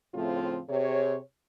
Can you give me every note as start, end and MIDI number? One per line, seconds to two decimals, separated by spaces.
0.14 0.60 45
0.14 0.60 49
0.14 0.60 53
0.14 0.60 57
0.14 0.60 60
0.14 0.60 65
0.69 1.17 48
0.69 1.17 68
0.69 1.17 73